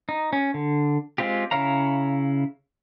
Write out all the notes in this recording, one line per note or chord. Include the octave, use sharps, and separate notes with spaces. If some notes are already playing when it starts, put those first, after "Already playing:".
D#4
C#4
D3
G#3 C4 F4 G4
C#3 E4 C#5 F5 A#5